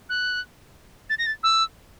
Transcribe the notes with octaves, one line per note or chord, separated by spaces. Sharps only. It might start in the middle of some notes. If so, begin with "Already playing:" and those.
F#6
A6
A#6
A6
E6